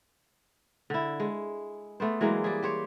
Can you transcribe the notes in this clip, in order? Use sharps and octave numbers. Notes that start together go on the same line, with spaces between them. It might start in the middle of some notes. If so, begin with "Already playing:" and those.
D3 E4
G#3
A3 B3 C5
E3 F#3 G#3 A#3
G3 G#4
G4 C5 C#5